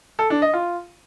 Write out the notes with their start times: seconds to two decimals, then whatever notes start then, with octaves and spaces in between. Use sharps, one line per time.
0.19 A4
0.30 D4
0.42 D#5
0.53 F4